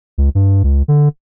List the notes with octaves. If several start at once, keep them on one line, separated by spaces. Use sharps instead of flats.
C#2
G2
C#2
D3